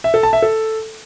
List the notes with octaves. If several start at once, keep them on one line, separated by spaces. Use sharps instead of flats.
E5
A4
A5
E5
A4